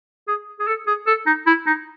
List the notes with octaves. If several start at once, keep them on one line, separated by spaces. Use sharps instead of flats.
G#4
G#4
A4
G#4
A4
D#4
E4
D#4